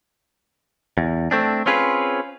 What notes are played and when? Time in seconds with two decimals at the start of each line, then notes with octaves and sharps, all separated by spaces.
0.98 E2
1.31 A3 C4 D4
1.66 C4 C#4 F4 G#4 B4